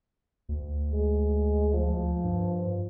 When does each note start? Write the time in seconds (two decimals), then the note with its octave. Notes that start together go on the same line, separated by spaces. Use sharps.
0.49 D2
0.92 G#3
1.73 F3
2.24 G2